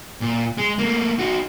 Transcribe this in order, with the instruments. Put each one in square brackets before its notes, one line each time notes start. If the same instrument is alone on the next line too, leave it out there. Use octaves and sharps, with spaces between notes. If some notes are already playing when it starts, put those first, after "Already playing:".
[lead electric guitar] A#2
G#3
A3 A#3
D#4 F#4